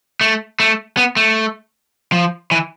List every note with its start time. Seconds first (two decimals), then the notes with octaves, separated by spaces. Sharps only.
0.21 A3
0.60 A3
0.97 B3
1.16 A3
2.12 F3
2.51 E3